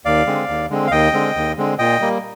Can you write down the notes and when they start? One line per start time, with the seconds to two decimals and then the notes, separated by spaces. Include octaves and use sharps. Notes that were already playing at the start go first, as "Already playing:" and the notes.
0.05 D#2 D5 F5
0.27 D3 G#3 C4
0.49 D#2
0.70 D3 G#3 C4
0.87 F5
0.91 D#2 D#5 G5
1.13 D3 G#3 C4
1.36 D#2
1.58 D3 G#3 C4
1.79 A#2 D#5 G5
2.01 G3 A#3